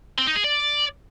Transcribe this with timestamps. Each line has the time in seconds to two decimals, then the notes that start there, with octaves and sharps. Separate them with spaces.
0.18 C4
0.27 D#4
0.36 G#4
0.44 D5